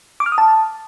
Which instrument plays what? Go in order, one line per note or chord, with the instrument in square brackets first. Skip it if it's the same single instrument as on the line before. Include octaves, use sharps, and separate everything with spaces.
[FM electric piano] D6
F6
D#6
A5